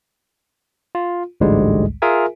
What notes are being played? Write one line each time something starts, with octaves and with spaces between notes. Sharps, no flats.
F4
A1 D2 G#2 D3 G3 G#3
F4 G#4 A#4 E5 G#5